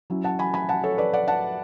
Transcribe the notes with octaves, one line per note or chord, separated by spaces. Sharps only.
F#3 C#4 E4
F#5 A5
G#5 B5
G#5 B5
F#5 A5
A4 C#5
B4 D5
D5 F#5
F#5 A5